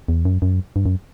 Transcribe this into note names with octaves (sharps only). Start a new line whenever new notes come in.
E2
F#2
F#2
G2
F#2